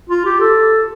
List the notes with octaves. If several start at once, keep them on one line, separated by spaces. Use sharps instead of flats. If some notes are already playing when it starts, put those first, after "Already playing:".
F4
G4
A4